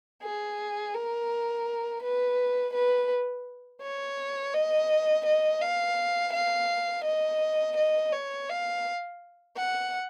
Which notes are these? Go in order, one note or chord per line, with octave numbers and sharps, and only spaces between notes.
G#4
A#4
B4
B4
C#5
D#5
D#5
F5
F5
D#5
D#5
C#5
F5
F#5